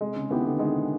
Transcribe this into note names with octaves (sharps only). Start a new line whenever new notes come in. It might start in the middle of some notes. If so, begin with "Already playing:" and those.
C3 G#3
C#3
D#3 B3 E4 G4
D3
D#3 G#3